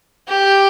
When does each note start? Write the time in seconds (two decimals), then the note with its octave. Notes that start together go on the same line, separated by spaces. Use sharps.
0.28 G4